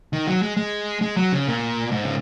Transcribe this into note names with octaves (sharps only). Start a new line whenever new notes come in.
D#3
F#3
G#3
G#3
G#3
F#3
C#3
A#2
G#2
C#3